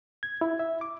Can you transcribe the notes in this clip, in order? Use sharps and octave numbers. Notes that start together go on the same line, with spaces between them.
G#6
E4
E5
D6